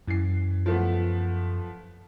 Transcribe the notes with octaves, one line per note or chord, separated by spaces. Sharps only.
F#2 E3 C7
F3 A3 B3